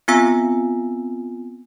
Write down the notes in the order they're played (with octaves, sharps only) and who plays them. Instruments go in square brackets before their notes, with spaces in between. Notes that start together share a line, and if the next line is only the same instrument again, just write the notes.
[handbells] B3 C4 F4 G#5 E6 A#6